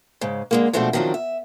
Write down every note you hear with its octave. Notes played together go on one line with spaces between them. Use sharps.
G#2 C#3
D3 G#3 A#3
B2 F3 G#3 A3 C4 D4
D#3 F3 F#3 C4 D4
E5